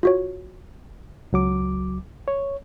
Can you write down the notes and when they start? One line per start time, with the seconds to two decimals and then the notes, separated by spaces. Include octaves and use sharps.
0.03 F4 F#4 C#5
1.33 C#2 F#3 D6
2.28 C#5